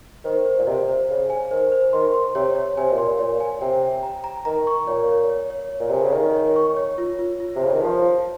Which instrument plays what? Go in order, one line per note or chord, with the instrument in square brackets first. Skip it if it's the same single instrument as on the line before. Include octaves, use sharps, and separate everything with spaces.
[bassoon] D#3 [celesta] C5
[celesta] C5
[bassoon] A#2
[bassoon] C3 [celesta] D#5
[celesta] C5
[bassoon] C#3 [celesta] C5
[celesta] G#5
[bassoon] D#3 [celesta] C5
[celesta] C5
[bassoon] D#3 [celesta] C6
[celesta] C6
[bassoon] C3 [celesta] C#5
[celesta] C#5
[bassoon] C3 [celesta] G#5
[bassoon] A#2
[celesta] C6
[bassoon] A#2 [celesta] C#5
[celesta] G#5
[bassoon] C3 [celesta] G5
[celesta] G5
A#5
A#5
[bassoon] D#3 [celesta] A#5
[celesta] C#6
[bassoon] A#2 [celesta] C#5
[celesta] C#5
C#5
C#5
C#5
[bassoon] A#2
[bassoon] C3 [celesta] G#5
[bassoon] C#3
[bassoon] D#3 [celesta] G#5
[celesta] C#5
C#6
C#5
F4
F4
F4
[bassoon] C3
[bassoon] C#3 [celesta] C5
[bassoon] D#3
[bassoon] F3 [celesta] C5
[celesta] F4